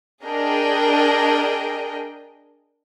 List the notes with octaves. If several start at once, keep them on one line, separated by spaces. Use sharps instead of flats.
D4 G#4 A#4 D#5 G5